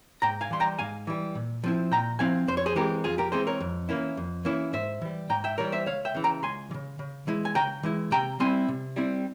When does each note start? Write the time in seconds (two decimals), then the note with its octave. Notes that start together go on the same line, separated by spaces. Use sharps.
0.22 G#2 G5 A#5
0.41 F5 G#5
0.51 E3 G3 C6
0.60 G5 A#5
0.79 G#2 F5 G#5
1.07 E3 G3
1.35 A#2
1.64 F3 C4 E4
1.91 A#2 G5 A#5
2.19 F3 C4 E4 F5 G#5
2.47 F2 C5
2.57 C#5
2.66 G#4 C5
2.76 E3 G#3 C4 G4 A#4
3.04 F2 F4 G#4
3.18 G4 A#4
3.32 E3 G#3 C4 G#4 C5
3.47 A#4 C#5
3.60 F2
3.89 E3 A#3 C#4 E4
4.17 F2
4.45 E3 A#3 C#4 E4
4.73 G#2 C5 E5
5.01 E3 G3
5.29 G#2 G5 A#5
5.44 E5 G5
5.58 E3 G3 A#4 C#5
5.72 C5 E5
5.86 C#2 C#5 F5
6.05 E5 G5
6.14 C#3 E3
6.24 G5 A#5
6.43 C#2 G#5 C6
6.71 E3
6.74 C#3
6.99 C#3
7.27 E3 G#3 E4
7.45 G#5
7.55 C#3 G5 A#5
7.83 E3 G#3 E4
8.11 C3 G5 A#5
8.40 G3 C4 E4 G#5 C6
8.68 C3
8.96 G3 C4 E4